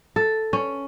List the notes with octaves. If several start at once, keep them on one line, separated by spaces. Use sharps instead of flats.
A4
C#4